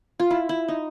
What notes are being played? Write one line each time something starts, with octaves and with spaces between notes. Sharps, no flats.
F4
E4
E4
D#4